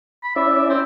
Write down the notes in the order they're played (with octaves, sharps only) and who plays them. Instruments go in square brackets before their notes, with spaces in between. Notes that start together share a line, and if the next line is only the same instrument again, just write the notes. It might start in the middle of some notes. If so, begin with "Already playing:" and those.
[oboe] B5
[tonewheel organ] C#4 E4 D5 [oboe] E5
[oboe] C4